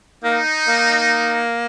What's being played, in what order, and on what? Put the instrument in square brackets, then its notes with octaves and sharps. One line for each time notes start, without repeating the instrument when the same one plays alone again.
[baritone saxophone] A#3 [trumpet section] D#4
[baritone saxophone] A#3